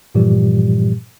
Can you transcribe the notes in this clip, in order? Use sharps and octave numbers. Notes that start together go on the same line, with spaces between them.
G2 A#2 E3 F3 G3 G4